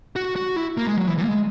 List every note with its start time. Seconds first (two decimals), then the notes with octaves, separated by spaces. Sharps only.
0.16 F#4
0.36 F#4
0.56 E4
0.77 A#3
0.87 G#3
0.98 F#3
1.08 E3
1.18 E3
1.24 A#3
1.28 G#3